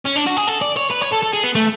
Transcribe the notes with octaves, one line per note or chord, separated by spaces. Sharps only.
C#4
D4
F#4
G#4
A4
D5
C#5
B4
C#5
A4
A4
G#4
B3
A3